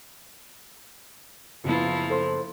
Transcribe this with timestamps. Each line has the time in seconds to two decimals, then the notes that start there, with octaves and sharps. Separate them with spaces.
1.64 F#1 F3 B3 E4 F4
2.10 A4 C5 C6